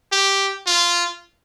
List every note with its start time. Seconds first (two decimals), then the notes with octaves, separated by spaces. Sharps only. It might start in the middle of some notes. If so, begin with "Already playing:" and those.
0.12 G4
0.67 F4